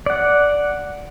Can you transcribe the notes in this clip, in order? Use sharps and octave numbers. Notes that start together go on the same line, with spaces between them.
D5 F#5